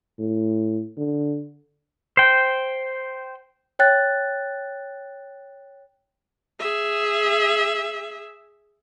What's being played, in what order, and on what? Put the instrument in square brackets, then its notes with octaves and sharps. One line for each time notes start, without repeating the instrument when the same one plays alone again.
[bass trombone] A2
D3
[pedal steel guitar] C5 G5
[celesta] C#5 G5 F#6 A6
[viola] G#4 E5